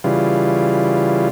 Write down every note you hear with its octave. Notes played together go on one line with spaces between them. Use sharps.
C#3 E3 G3 F4